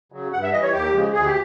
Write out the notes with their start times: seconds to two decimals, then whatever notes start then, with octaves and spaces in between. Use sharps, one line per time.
0.12 C#3 F#3
0.33 G2 F#5
0.43 E5
0.52 E3 G3 D#5
0.63 C#5
0.72 D#2 G4
0.93 C#3 F3 G#3
1.13 D2 G#4
1.25 G4